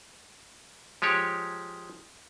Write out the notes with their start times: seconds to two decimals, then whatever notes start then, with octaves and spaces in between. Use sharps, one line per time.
1.02 F3 G#3 G4 C#5